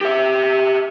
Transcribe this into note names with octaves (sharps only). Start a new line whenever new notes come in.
G4 E5